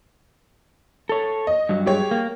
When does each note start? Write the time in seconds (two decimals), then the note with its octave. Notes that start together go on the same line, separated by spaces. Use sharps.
1.09 A4 C#5
1.47 D#5
1.69 G2 F#3
1.86 G#3 G4 C#5
2.11 A#3